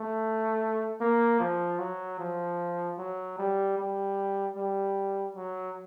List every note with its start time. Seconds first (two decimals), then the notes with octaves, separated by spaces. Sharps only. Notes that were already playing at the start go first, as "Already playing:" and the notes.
Already playing: A3
1.01 A#3
1.40 F3
1.79 F#3
2.20 F3
2.98 F#3
3.38 G3
3.78 G3
4.56 G3
5.36 F#3